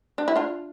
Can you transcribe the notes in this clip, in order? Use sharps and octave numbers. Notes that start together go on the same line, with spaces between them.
D4
E4
D4 F4